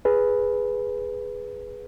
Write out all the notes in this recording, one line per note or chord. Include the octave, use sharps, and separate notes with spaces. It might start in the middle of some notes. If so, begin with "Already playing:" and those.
G#4 B4